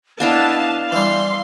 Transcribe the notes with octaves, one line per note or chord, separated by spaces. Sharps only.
B3 D4 E4 D#5 F5 A5
E3 G3 C6